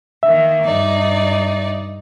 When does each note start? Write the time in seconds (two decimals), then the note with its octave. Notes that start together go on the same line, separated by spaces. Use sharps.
0.23 D#3 A#3 E5
0.64 G2 D#4 D5